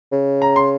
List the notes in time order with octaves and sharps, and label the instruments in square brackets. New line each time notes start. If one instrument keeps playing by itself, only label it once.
[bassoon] C#3
[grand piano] A#5
C6